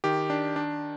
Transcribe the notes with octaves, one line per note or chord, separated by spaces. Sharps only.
D#3 G4
D4
D4